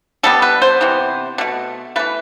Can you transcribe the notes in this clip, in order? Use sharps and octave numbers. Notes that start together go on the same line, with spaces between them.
D3 G3 B3 A4
B4
C5
C3 E3 B3
B2 A3
E3 A3 B4